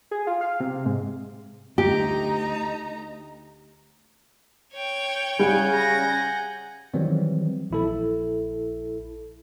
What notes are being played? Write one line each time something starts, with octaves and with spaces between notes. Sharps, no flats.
G#4
F4
F5
C3
G#2
D2 D#4 G4 A#5
C#5 G5
C#3 G3 F#5 G#5 G6
A#6
D#3 E3 F#3 G3 C4
A#1 E4 A4